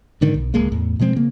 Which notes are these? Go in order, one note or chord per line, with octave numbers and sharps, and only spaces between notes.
G#2 D3 D#3
B1
D1 C#2 G#3 A#3
E2 A2
B2 F3 G#3 C4
C#3 A#3